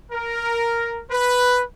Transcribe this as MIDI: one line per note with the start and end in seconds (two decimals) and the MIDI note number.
0.12 1.02 70
1.10 1.61 71